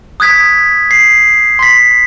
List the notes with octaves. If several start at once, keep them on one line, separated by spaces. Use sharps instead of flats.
D#6 F#6 G#6 B6
C7
C6 B6